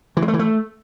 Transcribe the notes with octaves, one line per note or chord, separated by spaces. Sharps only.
E3
G#3
A3
E3
A3